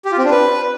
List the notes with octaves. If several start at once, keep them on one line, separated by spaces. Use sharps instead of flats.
G4
F4
C4
D4
B4